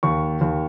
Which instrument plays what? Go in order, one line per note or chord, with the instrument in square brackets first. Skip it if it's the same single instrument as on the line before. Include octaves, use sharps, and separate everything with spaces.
[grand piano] D#2 C#6
D#2